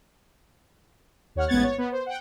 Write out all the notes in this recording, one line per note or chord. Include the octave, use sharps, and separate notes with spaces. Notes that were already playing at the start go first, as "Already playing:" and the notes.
D#2 C#5 F#5 F6
A1 G#2 B3 F#5 G#6 A6
C#5
B3
C5
F#5 G5